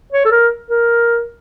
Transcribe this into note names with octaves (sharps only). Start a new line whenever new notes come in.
C#5
A4
A#4
A#4